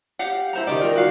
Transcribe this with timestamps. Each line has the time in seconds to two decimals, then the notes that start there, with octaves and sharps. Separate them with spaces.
0.19 G4 F5 F#5
0.53 E4 C5 A#5
0.67 D#3 G4 D5
0.81 F4 A#4
0.96 F#4 F5